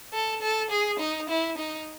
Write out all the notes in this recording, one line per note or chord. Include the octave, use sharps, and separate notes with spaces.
A4
A4
G#4
D#4
E4
D#4